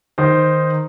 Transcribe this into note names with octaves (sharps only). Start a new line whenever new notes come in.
D#3 D#4 C5